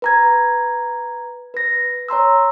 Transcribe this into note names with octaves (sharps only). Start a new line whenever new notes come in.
B4 A#5 G#6
B4 A#6
C#5 A#5 C6 E6